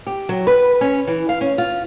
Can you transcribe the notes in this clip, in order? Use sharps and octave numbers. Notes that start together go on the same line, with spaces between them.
G4
F#3
B4
C#4
E3
F5
C#4
F4